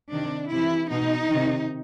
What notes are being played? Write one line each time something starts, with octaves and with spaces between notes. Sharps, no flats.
C3 D#3 D4
C3 E3 E4
B2 D#4
C3 D#3